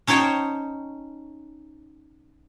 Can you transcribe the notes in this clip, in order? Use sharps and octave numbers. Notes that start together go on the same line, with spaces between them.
C#4 D#4 C5 C#5 G5 A5